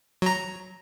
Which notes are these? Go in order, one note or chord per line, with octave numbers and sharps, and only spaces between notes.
F#3 A#5